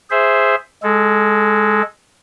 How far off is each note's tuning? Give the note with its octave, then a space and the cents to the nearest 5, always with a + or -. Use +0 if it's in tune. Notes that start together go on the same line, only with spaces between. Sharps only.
G#4 +0 C5 +0 E5 +5
G#3 +0 A4 -20